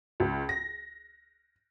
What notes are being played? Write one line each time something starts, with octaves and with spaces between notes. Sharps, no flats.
C#2
A#6